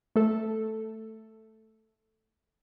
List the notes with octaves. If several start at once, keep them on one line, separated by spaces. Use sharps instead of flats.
A3 A4